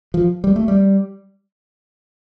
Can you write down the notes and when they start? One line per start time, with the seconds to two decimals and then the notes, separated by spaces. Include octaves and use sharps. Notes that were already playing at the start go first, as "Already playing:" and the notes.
0.14 F3
0.44 G3
0.56 A3
0.68 G3